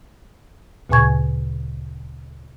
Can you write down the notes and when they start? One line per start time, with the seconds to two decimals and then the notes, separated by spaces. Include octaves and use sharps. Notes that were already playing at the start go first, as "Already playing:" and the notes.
0.89 D2 A#2 C#3 G#5 C#6 G#6